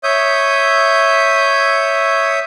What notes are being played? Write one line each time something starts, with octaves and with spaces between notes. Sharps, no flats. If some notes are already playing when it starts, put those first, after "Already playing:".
C#5 E5 D#6 G6